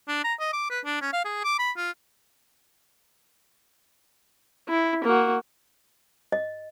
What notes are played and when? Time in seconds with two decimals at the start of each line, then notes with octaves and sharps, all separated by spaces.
0.08 D4
0.24 A#5
0.40 D#5
0.53 D6
0.70 B4
0.85 D4
1.01 C#4
1.13 F5
1.25 G#4
1.44 D6
1.59 B5
1.77 F4
4.68 E4
5.04 A#3 F#4
6.32 D#5